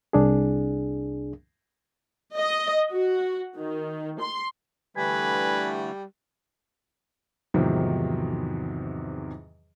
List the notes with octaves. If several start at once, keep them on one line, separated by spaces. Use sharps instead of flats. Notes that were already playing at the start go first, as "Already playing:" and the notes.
C2 D4 G#4
D#5
F#4
D#3
C6
D3 E3 G3 A3 B4 G#5
E2 G#2 C3 D#3 F3 F#3